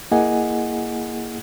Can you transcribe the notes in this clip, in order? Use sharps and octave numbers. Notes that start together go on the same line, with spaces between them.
A#3 E4 G#4 D#5 F#5 G#5